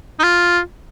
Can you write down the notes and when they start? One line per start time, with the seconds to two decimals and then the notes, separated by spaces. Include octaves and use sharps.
0.20 D#4
0.23 F4